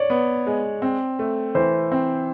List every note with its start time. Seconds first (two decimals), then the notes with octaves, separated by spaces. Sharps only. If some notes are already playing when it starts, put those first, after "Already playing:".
Already playing: C#5 D5
0.10 B3
0.46 G#3
0.82 C4
1.19 A3
1.55 E3 C5
1.92 C4